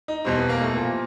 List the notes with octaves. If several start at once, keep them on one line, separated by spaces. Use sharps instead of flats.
D#4
E2 B2 G3 C4
B3
A#3
A3
A#2 F3 A#3